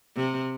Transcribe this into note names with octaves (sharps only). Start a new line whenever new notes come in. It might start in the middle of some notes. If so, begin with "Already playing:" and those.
C3